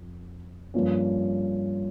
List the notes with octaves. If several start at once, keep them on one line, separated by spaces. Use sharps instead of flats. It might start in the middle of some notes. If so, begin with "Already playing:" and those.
Already playing: F2
G2 F3 A#3 C#4